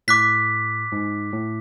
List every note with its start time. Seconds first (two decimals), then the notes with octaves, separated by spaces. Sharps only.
0.08 A2 D6 F#6 B6
0.92 G#2
1.33 A2